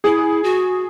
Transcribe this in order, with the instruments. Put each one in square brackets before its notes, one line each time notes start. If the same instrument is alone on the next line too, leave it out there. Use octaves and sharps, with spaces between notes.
[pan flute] E4 [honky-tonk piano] G#4
[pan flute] F#4